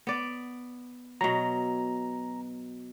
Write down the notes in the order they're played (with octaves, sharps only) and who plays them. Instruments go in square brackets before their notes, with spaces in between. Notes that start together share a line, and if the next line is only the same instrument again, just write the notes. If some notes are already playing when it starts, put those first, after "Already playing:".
[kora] B3 D5
[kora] B2 F#3 [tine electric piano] A#5